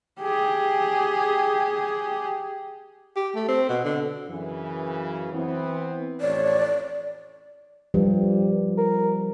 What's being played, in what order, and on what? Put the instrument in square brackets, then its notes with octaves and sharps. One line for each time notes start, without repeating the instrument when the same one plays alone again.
[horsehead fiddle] G4 G#4
[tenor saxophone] G4
A3
C4
B2
D3
[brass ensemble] F#2 C#3 E3
E3 B3 C4
[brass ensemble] A1 F2 C#5 [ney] D5
[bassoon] G2 [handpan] F3 G3
[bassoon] A#4